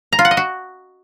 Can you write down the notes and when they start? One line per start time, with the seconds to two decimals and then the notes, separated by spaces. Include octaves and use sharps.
0.13 A#5
0.19 F4
0.25 F#5
0.31 D#5
0.37 F#4